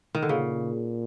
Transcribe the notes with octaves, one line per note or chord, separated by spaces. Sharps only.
D#3
D3
A#2 C#3